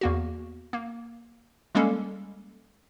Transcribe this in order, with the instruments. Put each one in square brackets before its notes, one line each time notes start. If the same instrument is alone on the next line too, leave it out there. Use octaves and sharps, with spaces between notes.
[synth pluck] E2 A#3 F#4
A#3
G3 G#3 A#3 C#4 A4